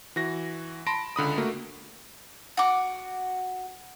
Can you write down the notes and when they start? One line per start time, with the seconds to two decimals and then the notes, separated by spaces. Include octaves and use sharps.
0.16 E3 F#4 A#6
0.87 A5 B5 C6 A#6 D7
1.16 C#2 D3 B5 D#6
1.37 A3 A#3 F#4
2.57 F#4 D6